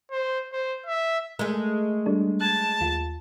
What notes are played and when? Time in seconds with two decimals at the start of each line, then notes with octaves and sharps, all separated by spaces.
0.12 C5
0.53 C5
0.86 E5
1.39 G#3 A3 G#4 A#4
2.06 G3 D4 A4
2.41 A5 F#6 G#6
2.81 D#2 F4